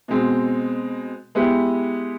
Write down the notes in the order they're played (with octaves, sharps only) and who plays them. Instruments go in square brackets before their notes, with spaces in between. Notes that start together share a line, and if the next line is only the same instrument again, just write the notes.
[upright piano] B2 G#3 C4
G#3 B3 E4 G4